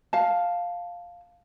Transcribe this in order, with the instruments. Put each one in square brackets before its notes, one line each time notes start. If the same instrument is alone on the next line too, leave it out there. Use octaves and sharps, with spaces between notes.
[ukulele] F5 A5